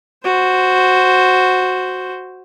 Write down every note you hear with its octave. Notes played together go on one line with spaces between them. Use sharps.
F#4 C5